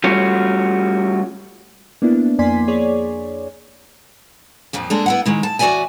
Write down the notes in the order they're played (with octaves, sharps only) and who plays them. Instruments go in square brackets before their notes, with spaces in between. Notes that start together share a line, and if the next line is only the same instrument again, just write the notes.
[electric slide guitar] G3 A3 C#4 F4 F#4
[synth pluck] A#3 B3 D4 E4
F2 A#3 D5 G#5 C6 B6
G#4 C#5 D5
[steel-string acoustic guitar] F2 A#2 F3
G#3 A#3 D4 A4
B3 E4 F#5
D#3 G#3 E4
A5
E2 F#4 A#4 D5 E5 G#5